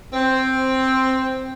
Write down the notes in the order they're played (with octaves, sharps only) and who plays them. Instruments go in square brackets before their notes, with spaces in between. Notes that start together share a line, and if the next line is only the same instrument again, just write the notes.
[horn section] C4